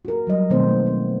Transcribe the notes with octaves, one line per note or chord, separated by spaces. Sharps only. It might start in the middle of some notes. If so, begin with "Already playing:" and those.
F#4 A#4
F#3 G3 D#5
B2 D#3 A3 B3 C4 C5
A#3
B3